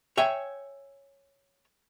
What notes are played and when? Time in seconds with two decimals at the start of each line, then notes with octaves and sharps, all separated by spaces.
0.17 C#5 E5 G5 G#5